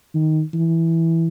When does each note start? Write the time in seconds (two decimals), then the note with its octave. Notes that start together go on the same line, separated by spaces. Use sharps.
0.14 D#3
0.54 E3